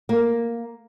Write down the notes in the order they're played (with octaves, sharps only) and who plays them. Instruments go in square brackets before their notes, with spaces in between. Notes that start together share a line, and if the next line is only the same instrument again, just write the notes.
[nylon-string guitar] A#3